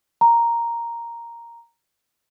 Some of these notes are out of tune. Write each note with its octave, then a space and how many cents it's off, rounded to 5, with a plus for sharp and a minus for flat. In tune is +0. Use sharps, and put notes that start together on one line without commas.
A#5 +0